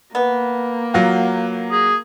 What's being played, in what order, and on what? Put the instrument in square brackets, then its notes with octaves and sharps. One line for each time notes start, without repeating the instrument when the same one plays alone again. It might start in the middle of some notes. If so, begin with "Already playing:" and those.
[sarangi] A#3 [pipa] B3
[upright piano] F#3 F4 F#4
[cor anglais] G#4